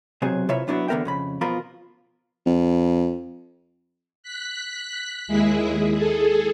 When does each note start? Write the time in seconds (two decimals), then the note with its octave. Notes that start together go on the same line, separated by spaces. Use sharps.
0.22 B1 C3 F#3 G#4 C5
0.49 C3 E4 F4 B4 C#5 E5
0.67 F#3 B3 D4 E4 F#4
0.88 E2 D3 B3 A#4 E5 G5
1.05 F2 C#3 B5
1.41 F2 B2 F3 F4 A#4 B5
2.46 F2
4.23 F#6 B6
5.27 D#2 G#3 E4 G#4
5.95 G#4 A4